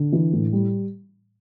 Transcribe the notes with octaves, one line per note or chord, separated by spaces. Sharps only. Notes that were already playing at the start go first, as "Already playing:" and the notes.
Already playing: D3
E3
A2
G3